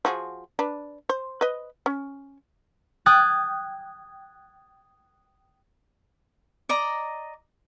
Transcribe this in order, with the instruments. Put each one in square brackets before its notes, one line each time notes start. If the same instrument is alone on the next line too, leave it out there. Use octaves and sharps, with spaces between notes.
[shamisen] F3 F#4 G#4
D4 B4
C5
B4 D#5
C#4
[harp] G5 D#6 F#6 G#6 A6
[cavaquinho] D5 D#5 A#5